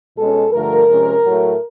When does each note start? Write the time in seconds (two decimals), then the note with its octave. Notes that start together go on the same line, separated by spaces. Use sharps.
0.17 B2 G#3 C#4 A4
0.53 G2 D3 F3 A3 A#4
0.88 C3 F3 G#3 C#4
1.24 A2 F#3 A3